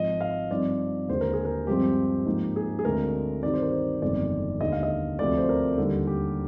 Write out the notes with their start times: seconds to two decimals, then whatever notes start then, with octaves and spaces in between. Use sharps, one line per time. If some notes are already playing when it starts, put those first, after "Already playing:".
Already playing: G#1 G#2 F3 D#5
0.21 F5
0.51 G2 F3 C4 D#4 D5
1.09 D#2 D3 G#3 C5
1.21 A#4
1.33 G#4
1.45 A#4
1.67 G2 F3 G#3 C4 G4
2.26 G#2 F3 A#3 D#4
2.56 G#4
2.79 G#4
2.84 D2 D3 G#3 C4 A#4
3.43 G2 D#3 G3 C4 D5
3.54 C5
3.63 A#4
3.73 C5
4.02 G1 F2 C3 D#3 G#3 D5
4.60 D#2 D3 G#3 D#4 D#5
4.72 F5
4.83 D#5
5.19 D2 C3 F3 D5
5.38 C5
5.49 A#4
5.78 D#2 D3 G3 C4 D#4
6.07 G4